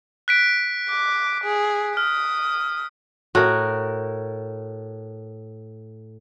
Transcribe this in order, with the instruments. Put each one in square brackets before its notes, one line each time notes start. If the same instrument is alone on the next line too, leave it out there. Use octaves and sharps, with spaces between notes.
[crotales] F#6 B6 D7
[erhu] D6
G#4
[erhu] D#6 [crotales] F6
[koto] A2 [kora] F#4 A#4